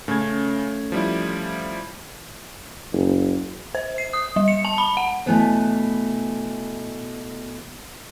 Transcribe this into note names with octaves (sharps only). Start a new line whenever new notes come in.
C#3 A3 C#4 G#6
F3 G3 E4
F#1
C5
C7
D#6
G3
C#7
A5
B5
F#5
B2 E3 A3 B3 C#5